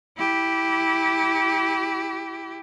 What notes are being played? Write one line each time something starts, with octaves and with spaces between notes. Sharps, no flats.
E4 G4